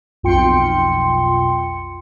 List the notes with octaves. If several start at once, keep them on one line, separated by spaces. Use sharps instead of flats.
B1 F2 F4 G5 C6 C#7